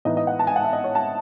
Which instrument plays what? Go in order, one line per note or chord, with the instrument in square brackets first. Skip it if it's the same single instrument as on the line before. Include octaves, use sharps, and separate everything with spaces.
[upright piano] A2 E3 B3 D#4 D#5
D#5
F#5
A5
G#5
F#5
E5
D#5
C#5
A5